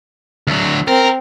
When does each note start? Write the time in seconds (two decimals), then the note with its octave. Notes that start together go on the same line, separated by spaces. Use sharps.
0.47 D2 F#3
0.88 C4 A#4